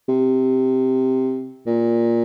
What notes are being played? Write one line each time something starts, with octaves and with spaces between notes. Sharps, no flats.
C3
A#2